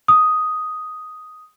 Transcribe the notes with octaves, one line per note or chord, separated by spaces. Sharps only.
D#6